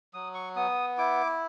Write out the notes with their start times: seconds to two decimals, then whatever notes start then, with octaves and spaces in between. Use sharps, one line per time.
0.14 F#3 D#6
0.34 C#6
0.56 B3 D#6
0.98 E4 D6